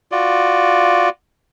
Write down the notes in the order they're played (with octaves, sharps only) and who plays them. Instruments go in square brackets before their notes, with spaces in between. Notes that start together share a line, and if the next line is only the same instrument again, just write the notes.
[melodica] F4 F#4 D5